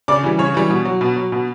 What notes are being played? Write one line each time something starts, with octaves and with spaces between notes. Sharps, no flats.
C#3 D5 D6
E3 G3
C#3 C#5
E3 G3
B2
F#3
B2
F#3
B2